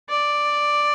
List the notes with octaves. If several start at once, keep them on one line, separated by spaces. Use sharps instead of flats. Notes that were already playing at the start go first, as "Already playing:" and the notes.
D5